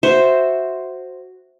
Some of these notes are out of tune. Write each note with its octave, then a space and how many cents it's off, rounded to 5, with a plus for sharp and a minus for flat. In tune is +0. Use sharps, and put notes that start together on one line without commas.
F#4 +0 C5 +0 E5 -5